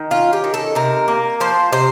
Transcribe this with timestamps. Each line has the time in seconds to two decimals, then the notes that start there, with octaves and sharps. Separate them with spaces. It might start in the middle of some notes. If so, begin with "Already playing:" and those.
Already playing: D#3
0.11 C#4 F4
0.33 G4
0.44 D#3
0.54 A4
0.75 C3 A#4
1.08 A#3
1.40 F3 C5
1.72 C3 C5